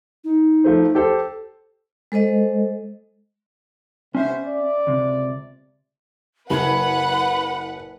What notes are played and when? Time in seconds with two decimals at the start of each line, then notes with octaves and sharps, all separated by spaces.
0.24 D#4
0.64 F3 A3 C5
0.95 G4 A4 C5
2.12 G#3 A4 C5 D#5
4.15 C3 B3 C#4 C5 E5
4.45 D5
4.87 C#2 C3
6.50 F#1 B4 F#5 B5 G#6